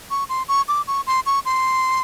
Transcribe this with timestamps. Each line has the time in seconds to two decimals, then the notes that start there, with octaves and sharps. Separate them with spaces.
0.11 C#6
0.29 C6
0.48 C#6
0.68 D6
0.88 C#6
1.07 C6
1.26 C#6
1.45 C6